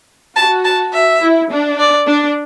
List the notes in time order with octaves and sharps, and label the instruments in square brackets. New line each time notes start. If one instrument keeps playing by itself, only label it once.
[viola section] F#4 [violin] A5
[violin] A5
E5
[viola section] E4
D4
[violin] D5
[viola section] D4